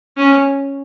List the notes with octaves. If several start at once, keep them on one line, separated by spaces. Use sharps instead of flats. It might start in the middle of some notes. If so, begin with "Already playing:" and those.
C#4